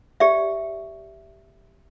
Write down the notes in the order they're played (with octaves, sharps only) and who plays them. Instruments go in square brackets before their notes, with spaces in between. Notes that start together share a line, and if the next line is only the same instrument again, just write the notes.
[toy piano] G4 D5 E5